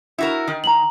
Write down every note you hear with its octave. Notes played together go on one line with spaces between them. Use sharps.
E4 F#4 A#4
D#3
A#5 F#7